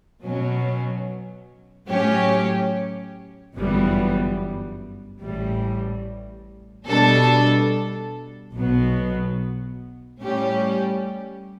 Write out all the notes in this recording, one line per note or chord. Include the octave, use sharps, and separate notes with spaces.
B2 F#3 C#4
A2 F#3 C#4 G4 C#5
G1 F#2 E3 G3 B3
A1 A2 E3 G3
B2 G3 D4 A4
B1 B2 F#3 B3
A2 G3 C#4 G4